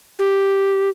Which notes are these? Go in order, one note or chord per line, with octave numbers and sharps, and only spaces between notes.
G4